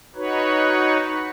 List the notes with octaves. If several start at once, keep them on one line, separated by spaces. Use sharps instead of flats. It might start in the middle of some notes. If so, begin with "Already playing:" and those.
D#4 F#4 B4 C#5